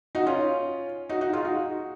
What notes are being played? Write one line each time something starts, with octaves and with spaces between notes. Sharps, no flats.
D#4 F#4
C#4 F4
D#4 F#4
D#4 F#4
F4 G#4
D#4 F#4